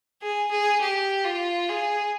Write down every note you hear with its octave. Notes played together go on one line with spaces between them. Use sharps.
G#4
G#4
G4
F4
G#4